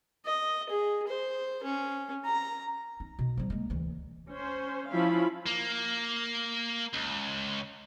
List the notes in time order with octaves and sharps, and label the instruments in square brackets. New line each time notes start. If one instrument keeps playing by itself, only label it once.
[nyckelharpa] D#5
G#4
C5
C#4
A#5
[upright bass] D#4
B2
F3 G3
G#3 A#3
D2 E3
[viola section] C#4 C5
F3 C#4 E4 F5 B5
[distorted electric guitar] A#3
C#2